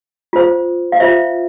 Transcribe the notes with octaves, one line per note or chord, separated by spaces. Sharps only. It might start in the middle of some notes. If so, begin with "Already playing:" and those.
F4 C5
F5
F4 C5 E5